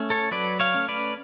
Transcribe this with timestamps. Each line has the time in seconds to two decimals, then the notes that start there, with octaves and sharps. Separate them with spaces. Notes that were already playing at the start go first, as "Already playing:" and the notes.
Already playing: A3 C#4
0.10 A4 C#5
0.31 F#3 B4 D5
0.60 C#5 F5
0.74 A3 C#4
0.88 B4 D5